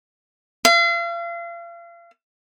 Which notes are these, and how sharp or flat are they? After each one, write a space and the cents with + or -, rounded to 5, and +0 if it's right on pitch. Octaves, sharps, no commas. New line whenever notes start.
F5 -40